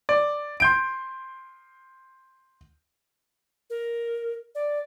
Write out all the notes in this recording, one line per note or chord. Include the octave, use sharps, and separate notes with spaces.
D5
C6 G6 D7
A#4
D5